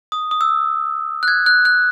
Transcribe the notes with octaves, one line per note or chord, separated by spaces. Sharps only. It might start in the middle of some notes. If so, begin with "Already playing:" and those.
D#6
D#6
E6
F#6
G#6
F#6
F#6